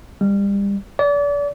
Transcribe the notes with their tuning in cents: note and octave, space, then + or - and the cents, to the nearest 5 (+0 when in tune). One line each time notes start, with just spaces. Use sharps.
G3 +30
D5 -35